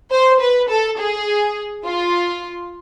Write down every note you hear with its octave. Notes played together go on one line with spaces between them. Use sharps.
C5
B4
A4
G#4
F4